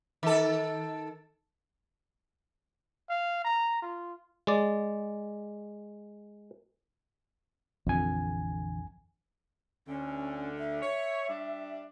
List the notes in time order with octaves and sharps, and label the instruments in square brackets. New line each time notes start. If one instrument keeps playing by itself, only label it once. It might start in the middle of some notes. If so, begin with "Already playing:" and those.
[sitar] D#3 A4
[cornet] F5
A#5
F4
[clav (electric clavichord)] G#3 D5
[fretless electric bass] A#1 D3 E3 [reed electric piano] F2 G#5
[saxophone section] D2 D3 [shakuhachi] C#4
[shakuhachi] E5
[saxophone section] C#5
G3 D4